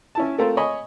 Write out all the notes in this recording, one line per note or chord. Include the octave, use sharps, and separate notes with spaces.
C#4 E4 A5
A3 C4 F4 A4 A#4 C5
C#5 D#5 G#5 B5